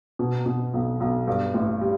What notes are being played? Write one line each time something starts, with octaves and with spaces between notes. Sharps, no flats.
B2
B2
B1
B1
G2
A1
G3